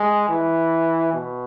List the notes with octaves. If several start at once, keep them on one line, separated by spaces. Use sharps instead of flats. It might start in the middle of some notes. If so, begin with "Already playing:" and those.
Already playing: G#3
E3
B2